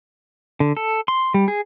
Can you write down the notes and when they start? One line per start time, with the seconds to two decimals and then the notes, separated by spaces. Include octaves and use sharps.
0.60 D3
0.77 A4
1.08 C6
1.34 G3
1.48 G#4